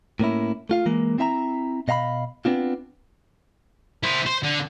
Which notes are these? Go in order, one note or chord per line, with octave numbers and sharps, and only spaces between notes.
A2 A#3 C#4 E4
A3 F4 F5
E3 G#3 A#3
C4 E4 E5 A5 A#5
B2 D#5 F5 A#5 B5
B3 C4 D4 F4
E4 C5
C5
D3